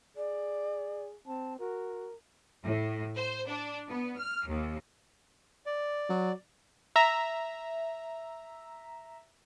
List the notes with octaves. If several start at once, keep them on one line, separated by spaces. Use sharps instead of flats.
G#4 D5
C4 A5
F#4 A#4
A2
C5
D4
B3
F6
D#2
D5
F#3
E5 A#5